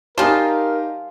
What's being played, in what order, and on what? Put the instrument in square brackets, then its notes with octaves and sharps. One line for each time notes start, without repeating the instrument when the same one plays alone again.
[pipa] G3 F4 [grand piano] D#4 G4 [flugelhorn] A#4 [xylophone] G#5 A5